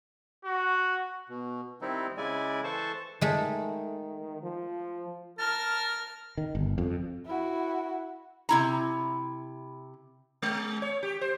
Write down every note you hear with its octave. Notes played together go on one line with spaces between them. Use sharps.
F#4
B2
D#3 G3 C4 D#4 E4
C#3 G#3 E4 D5 G#5
E3 A4 C5 A5 C#6
D#3 G#3 A3
F3
A#4 A5 F6
D#3
G1
F2
E4 F#4
C3 E4 A#5
G#3
C#5
G4
C5